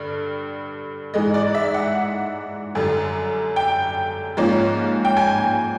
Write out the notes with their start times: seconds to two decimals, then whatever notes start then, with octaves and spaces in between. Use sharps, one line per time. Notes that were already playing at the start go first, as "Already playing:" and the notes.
Already playing: G2 D3 G3
1.14 G#2 E3 G#3 D#5
1.34 D5
1.55 E5
1.74 F#5
2.75 F#2 D3 G3
3.56 G5
4.37 G#2 F3 A#3 C#4
5.05 G5
5.17 G#5